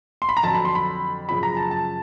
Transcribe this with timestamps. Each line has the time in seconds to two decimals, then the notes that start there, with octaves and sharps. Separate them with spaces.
0.22 C6
0.29 B5
0.37 A#5
0.43 F2 D3 F#3 A5
0.54 B5
0.65 C6
0.75 B5
1.29 F#2 C#3 F3 B5
1.43 A#5
1.57 A5
1.71 A5